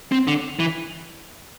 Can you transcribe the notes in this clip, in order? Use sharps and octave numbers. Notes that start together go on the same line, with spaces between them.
C4
D3
E3